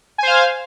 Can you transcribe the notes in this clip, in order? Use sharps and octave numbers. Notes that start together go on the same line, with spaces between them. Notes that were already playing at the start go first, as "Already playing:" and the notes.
C5 F5 G#5